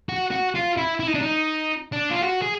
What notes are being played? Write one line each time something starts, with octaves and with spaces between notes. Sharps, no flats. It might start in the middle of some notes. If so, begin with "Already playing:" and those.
F#4
F#4
F4
E4
E4
D#4
D4
D#4
D4
F4
F#4
G#4